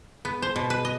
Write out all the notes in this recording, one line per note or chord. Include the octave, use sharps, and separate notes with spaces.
B3
C5
B2
B4
D#5